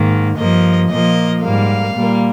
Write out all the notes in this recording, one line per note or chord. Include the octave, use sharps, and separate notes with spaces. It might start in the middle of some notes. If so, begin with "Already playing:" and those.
Already playing: G#2 D#3 A#3
G2 F3 A#3 D#5
A#2 F3 A#3 D#5
G#2 G3 A#3 F5
A#2 G3 A#3